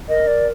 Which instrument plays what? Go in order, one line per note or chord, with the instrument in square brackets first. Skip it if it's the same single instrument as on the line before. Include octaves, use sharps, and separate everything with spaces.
[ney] A#4 [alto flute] D#5
[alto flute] D5